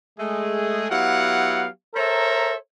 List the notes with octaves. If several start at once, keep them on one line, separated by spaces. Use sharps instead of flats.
G#3 A3 G#4
F#3 B3 E4 G4 F5 F#5
A4 A#4 C5 C#5 E5 A#5